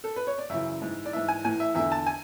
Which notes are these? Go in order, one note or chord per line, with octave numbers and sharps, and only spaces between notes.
A4
B4
C#5
D5
F#2 C#3 E3 E5
G#2 E3
D5
G#2 E3 E5
G#5
A2 E3 G#5
E5
E2 D3 E5
A5
G#5